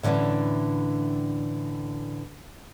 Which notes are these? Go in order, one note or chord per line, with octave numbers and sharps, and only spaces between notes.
A2 D3 E3 C#4 D4